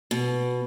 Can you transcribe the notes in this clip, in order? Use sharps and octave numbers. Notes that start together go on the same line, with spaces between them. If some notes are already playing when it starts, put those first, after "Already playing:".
B2